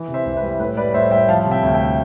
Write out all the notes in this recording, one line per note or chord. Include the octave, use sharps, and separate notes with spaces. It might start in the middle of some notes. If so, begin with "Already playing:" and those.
Already playing: E3
C3
C5 E5
C2
B4
G3
A2 B4
G3 B4 D5
A2 C5 E5
G3 E5 G5
F3 F5 A5
C3
E5 G5
D2
E5 G5